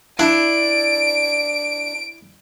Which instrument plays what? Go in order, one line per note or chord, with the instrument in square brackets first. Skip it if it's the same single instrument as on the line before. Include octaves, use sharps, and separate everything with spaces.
[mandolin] D4 [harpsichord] E4 [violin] D7